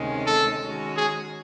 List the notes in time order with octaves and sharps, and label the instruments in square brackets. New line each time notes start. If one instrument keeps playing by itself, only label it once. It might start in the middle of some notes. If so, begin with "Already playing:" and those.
Already playing: [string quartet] D2 C3 D#3 G#3 C#4
[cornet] A4
[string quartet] D#3 G#3 C#4 F#4
[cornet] G#4